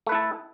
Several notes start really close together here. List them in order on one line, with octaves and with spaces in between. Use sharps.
A3 B4 E4 A4